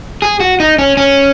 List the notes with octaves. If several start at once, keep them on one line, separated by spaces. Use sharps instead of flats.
G#4
F#4
D#4
C#4
C#4